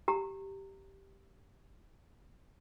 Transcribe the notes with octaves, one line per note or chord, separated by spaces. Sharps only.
G4 A#5